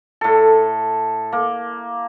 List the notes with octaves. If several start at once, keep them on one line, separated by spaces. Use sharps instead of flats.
A2 A4
A#3